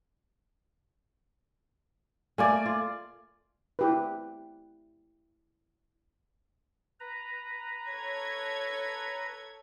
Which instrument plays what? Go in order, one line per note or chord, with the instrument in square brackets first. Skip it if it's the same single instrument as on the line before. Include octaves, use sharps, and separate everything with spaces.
[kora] A3 A#3 [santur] D5 G#5
[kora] F4
[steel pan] E4 G4 B4
[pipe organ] B4 A#5
[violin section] A4 C#5 G#6